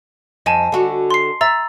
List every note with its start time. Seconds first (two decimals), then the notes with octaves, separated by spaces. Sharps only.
0.46 F2 D#5 G#5 A5
0.72 D3 F#4
1.11 C6 C7
1.41 E5 A#5 E6 A6